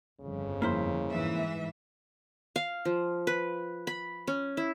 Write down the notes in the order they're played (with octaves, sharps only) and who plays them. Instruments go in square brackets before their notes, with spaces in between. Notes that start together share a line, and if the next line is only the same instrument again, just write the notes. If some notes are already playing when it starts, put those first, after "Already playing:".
[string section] G1 F2 [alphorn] C#3
[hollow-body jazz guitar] A#3 E4 C5
[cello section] G#2 E3 E5
[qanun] F5
F3
B4
B5
C#4
E4